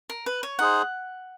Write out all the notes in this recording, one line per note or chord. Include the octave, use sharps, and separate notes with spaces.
A#4
B4
C#5
D#4 G#4 C5 F#5